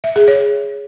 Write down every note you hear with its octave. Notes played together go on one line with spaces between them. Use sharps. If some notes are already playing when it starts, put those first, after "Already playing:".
E5
G#4
C#5